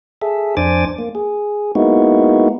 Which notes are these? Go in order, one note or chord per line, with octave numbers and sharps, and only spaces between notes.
G#4 A4 E5
F2 D4 C5 G#5 D6 A6
A#3
G#4
G#3 A#3 B3 D#4 E4 F#4